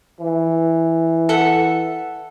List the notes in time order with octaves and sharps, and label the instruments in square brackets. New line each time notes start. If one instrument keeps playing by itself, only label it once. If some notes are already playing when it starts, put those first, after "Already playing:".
[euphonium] E3
[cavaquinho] A4 E5 F#5